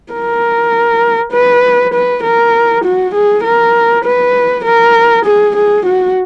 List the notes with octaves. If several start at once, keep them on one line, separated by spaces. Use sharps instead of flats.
A#4
B4
B4
A#4
F#4
G#4
A#4
B4
A#4
G#4
G#4
F#4